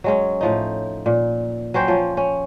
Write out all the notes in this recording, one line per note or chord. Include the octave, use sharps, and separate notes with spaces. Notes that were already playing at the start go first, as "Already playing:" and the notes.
F#3 G#3 C#4
A2 F3 D#4
A#2
F#3 C#4 C5 G5
F3 C#4
C#4